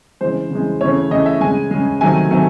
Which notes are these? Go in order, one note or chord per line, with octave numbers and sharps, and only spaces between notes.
C#3 E3 G#3 C5
C#3 E3 G#3
C#3 E3 A3 C#5
C#3 E3 A3 D#5
E5
C#3 G#3 G#5
C#3 G#3
C3 D#3 F#3 A3 G#5
C3 D#3 F#3 A3